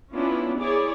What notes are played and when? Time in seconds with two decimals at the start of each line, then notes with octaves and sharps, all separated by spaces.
0.14 B3 C#4 D4 E4 F4
0.59 E4 G#4 C#5 D5